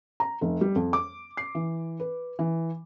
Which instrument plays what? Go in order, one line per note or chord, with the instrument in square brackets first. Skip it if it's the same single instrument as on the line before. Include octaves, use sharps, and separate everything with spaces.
[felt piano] A#5
F1
G3
F2
D6
C7
E3
B4
E3